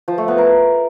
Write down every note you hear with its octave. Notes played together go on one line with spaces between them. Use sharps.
F3
A3
B3
A#4